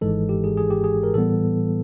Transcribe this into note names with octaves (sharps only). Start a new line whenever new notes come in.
G#1 G#2 E3 G#3 A4
G4
G#4
G#4
G4
G#4
A#4
A2 E3 G3 B3 A4